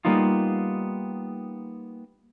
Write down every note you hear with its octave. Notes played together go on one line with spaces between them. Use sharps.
G3 A#3 B3 D#4 F4